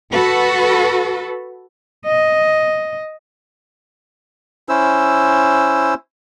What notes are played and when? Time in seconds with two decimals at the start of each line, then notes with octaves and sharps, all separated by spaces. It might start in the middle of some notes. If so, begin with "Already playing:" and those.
0.13 F#4 A4 B4
2.06 D#5
4.69 C#4 E4 C5 E6